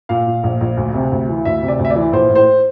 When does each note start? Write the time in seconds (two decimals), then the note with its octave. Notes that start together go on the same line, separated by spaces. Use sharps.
0.09 A#2 F5
0.27 A#2
0.43 A#1
0.61 A#1
0.77 D2
0.94 C3
1.12 D2
1.29 E3
1.45 D2 E5
1.62 C3
1.68 D5
1.79 D2
1.85 E5
1.90 D5
1.95 E3
2.12 A#1 C5
2.29 A2
2.35 C5